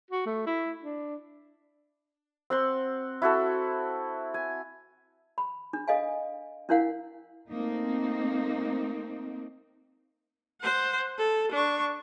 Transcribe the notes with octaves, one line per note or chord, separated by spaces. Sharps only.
F#4
A3
E4
D4
C4 F#5 C6
E4 F#4 A4
G#5
B5
D4
A4 D#5 F5 G#5
C#4 D4 E4 A#4 F5 F#5
A3 A#3 C4 D#4
C5 F#5
A4
D4 C#6